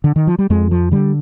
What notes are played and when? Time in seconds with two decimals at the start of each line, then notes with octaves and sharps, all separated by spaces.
0.04 D3
0.16 D#3
0.27 F3
0.39 G3
0.50 F2 G#3
0.71 F3
0.92 D3 G3